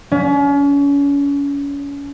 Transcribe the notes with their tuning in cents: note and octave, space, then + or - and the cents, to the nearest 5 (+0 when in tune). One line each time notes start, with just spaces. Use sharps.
C#4 +35